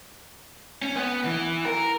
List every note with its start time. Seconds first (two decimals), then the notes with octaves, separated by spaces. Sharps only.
0.82 C#4
0.96 B3
1.25 E3
1.65 A#4